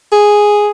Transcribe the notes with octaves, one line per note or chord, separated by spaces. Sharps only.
G#4